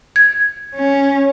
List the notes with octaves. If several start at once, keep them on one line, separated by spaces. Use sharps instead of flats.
G#6
C#4